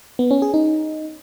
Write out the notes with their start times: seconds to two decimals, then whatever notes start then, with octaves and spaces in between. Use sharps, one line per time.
0.19 B3
0.31 C#4
0.42 G#4
0.54 D#4